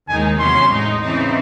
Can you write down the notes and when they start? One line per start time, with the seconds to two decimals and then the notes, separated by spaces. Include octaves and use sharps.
0.08 D#2 D#3 G#3 D#4 G#5
0.39 E2 C3 F#3 C#4 C6
0.71 A2 G#3 D#4
1.02 C#3 E3 C4 D#4